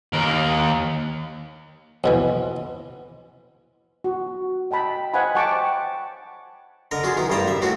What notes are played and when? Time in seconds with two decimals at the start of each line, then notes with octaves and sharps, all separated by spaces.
0.13 D#2 A#4
2.04 F2 B2 E3
4.04 F#4
4.71 D#5 G5 A5 B5
5.14 C5 D#5 F5 F#5 G#5 B5
5.35 F#5 G5 A5 C#6 D6
6.91 D3 A#4 D#5
7.03 F#3 F4 G#4
7.17 D#3 B3 E4
7.30 A1 G2 G3 C5 G5 A#5
7.48 E5
7.62 A3 C4 E4 F#4